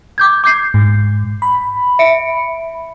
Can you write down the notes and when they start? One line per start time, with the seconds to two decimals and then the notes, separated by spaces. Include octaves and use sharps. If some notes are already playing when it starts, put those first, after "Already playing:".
0.18 D6 G6 G#6
0.44 D6 G6 C7
0.74 G#2
1.42 B5
1.99 E5 C#7 D7